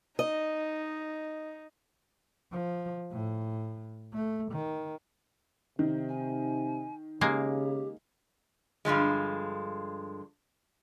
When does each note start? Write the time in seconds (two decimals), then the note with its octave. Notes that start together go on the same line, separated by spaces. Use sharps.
0.19 D#4 D#5
2.52 F3
3.12 A2
4.13 A3
4.51 D#3
5.79 C3 D#3
6.09 G#5
7.21 C#3 G#3 A#3 G4
8.85 G2 D3 F3 G#3